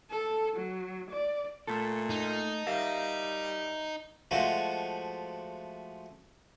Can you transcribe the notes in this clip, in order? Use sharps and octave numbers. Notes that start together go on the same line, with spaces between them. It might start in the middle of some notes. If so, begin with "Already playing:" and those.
A4
F#3
D5
A#2 A3 A4
D#4
G3 A#4 E5 F5
F3 G#3 A3 F#4